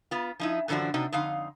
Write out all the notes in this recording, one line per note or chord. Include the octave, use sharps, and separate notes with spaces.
B3 F4
F3 D#4 E4
F#2 D3 E3 F3 D4 F#4
C3 D4 D#4 F#4
F2 D3 D#4 F5